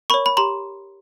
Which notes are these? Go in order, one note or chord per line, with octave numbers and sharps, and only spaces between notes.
A#4 C#5 B5 C#6
B5
G4 A#5 C6